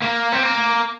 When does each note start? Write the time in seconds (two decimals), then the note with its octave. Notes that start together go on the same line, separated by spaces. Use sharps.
0.02 A#3
0.32 C4
0.43 A#3